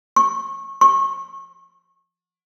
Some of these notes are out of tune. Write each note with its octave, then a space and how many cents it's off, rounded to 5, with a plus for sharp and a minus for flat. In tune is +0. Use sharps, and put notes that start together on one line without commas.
C#6 -25
C#6 -30